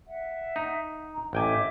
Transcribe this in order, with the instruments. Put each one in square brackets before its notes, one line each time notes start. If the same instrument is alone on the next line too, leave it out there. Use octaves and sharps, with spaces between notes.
[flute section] E5 F#5
[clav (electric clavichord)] D#4
[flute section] A#5
[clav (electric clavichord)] A1 G5 G#5 [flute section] D#5 E5 D6